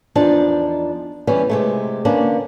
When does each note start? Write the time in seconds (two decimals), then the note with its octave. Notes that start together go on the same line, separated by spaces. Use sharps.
0.15 E2 F3 D4 D#4 A5
1.27 E3 G3 B3 C#4
1.50 C3 G#3 A3
2.05 D3 A#3 B3 C#4 D4